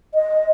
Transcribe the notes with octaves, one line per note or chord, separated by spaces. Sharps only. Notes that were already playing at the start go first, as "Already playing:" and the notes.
D#5